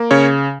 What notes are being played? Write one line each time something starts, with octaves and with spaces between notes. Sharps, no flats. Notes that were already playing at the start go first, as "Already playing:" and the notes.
Already playing: A#3
C#3 C#4 C#5